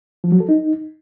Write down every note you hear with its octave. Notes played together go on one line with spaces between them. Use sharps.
F3
F#3
A4
D#4